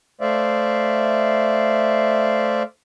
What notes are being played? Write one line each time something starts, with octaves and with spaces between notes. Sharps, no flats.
A3 C5 D5 E5 F5